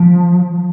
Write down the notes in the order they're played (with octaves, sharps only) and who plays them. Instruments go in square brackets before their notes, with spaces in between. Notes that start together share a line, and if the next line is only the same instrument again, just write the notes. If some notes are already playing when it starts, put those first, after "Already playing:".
Already playing: [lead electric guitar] F3